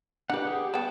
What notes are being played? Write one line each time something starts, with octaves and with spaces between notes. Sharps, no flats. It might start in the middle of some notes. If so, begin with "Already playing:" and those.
D4 G4 B4 F#5
G4 G#4
G3 B3 G5 A5